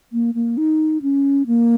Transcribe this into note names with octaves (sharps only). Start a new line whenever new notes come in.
A#3
A#3
D#4
C#4
A#3